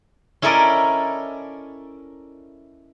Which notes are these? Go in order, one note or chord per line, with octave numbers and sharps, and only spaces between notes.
C#4 E4 A4 A#4 D5 D#5